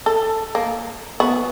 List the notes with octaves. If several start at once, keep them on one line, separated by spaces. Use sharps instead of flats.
A4
A#3
B3 F#4